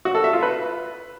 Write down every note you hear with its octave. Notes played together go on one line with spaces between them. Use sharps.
F#4
A4
E5
F4
B4